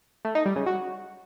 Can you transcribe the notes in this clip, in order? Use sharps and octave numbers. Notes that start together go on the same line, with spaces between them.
A3
D#4
G3
C#3
F#4